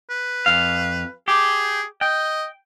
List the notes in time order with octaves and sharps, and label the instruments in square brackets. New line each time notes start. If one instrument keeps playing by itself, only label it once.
[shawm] B4
[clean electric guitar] F2 F5
[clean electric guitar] G4 [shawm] G#4
[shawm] D#5 [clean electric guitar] G5